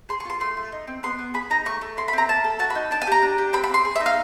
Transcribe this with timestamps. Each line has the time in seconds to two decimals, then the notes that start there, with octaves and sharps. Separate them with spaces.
0.09 G#4 C6
0.20 C#6
0.25 F4 C6
0.40 A3 C6
0.57 A3
0.72 D#4
0.87 C4
1.03 B3 C6
1.19 B3
1.34 G#4 B5
1.50 D#4 A#5
1.65 A3 C#6
1.81 A3
1.97 E4 C6
2.08 B5
2.13 C4 A#5
2.28 A#3 A5
2.44 A4
2.59 F#4 A5
2.70 B5
2.75 D#4
2.91 D4 A5
3.02 G#5
3.07 G4 A#5
3.23 D4
3.38 G4
3.53 C4 B5
3.64 B5
3.69 C4 C6
3.85 G#4
3.96 E5
4.00 D#4
4.06 F5